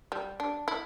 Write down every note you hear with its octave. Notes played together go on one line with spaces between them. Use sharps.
G3
D4
E4